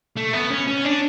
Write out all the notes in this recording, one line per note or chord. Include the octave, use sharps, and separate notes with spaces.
A3
B3
C#4
C#4
D4